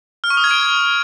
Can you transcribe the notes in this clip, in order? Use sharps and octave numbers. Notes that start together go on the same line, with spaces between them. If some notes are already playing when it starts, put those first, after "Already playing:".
F6
C#6
D#6
G#6
D7